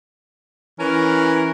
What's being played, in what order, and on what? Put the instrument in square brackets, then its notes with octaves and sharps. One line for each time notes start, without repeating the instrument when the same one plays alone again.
[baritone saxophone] E3 [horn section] C#4 A#4